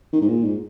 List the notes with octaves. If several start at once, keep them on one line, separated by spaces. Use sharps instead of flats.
D#3
G#2
A#2
G#2